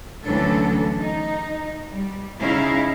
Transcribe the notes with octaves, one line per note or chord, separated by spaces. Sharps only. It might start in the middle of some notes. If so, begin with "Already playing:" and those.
D2 E3 F#3 C#4 D4 A4
D#4
G3
C#3 C#4 D#4 E4 E5 F5